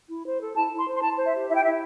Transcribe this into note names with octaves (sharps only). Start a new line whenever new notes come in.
E4
C5
A4
E4 A5
E4
C6
C5
C6
E4 A5
C5
E5
G4
E4 E5
G5
E4 E5